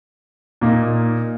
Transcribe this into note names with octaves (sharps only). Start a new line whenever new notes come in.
A#2 A#3 D#4 A#4